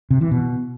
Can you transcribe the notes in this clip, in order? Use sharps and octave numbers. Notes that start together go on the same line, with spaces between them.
C3
E3
B2